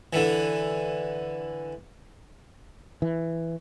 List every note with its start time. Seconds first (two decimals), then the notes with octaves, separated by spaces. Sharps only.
0.13 D3 E3
3.02 E3